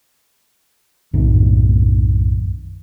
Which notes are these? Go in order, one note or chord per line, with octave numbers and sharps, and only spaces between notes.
B1 F#2 A2 D#3